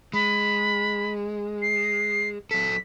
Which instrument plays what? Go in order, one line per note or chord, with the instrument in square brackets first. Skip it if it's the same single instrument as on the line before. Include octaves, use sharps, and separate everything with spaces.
[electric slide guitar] G#3 [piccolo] B5
[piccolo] C7
[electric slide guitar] F#3 A4 [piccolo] B6